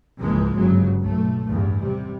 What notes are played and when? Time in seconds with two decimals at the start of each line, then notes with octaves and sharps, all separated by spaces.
0.20 C#2 G#2 E3 F3 G#3 A#3
0.55 G1 C#3 F#3
0.98 B1 A3
1.48 A1 E2 G2
1.80 C3 G3